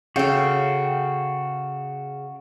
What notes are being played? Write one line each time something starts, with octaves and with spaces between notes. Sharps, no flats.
C#3 F#4 A4 F5 G5